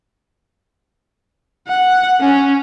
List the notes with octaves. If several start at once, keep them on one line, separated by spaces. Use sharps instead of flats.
F#5
C#4